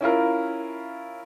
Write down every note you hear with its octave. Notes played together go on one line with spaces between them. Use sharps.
C#4 E4 F4 A#4